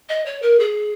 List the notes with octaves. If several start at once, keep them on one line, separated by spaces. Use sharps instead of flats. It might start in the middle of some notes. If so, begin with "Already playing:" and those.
D#5
C#5
A#4
G#4